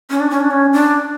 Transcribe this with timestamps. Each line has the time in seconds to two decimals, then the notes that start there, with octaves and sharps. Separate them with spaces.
0.10 C#4
0.20 D4
0.31 C#4
0.41 D4
0.51 C#4
0.73 D4